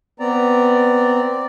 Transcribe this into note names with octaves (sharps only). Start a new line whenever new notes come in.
B3 C4 D5 A#5